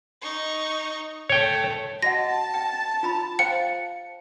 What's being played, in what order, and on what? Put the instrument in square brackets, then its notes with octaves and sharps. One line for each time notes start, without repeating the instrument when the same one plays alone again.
[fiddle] D#4 C#6
[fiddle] A3 [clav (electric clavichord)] C#5 G5
[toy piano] F#4 D#5 F#5 [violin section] A5 [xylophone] A#6
[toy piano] G5
F4 A#5 B5
[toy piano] C5 F5 G5 [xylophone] C#7